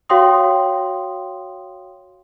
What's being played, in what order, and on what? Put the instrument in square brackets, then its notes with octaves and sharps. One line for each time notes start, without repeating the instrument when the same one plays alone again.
[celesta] F#4 C#5 F5 G5 C6 D#6